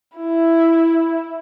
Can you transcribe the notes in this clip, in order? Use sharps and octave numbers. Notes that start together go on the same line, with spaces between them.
E4